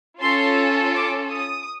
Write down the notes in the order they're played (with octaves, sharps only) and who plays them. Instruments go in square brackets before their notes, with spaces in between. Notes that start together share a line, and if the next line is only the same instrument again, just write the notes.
[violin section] C#4 F4 A4 C6
D6
D#6